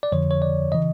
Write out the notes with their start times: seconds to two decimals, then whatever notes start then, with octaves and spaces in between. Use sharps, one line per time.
0.03 D5
0.12 F2 D3 F3 C#5
0.31 C#5
0.42 D5
0.72 C#3 E3 D#5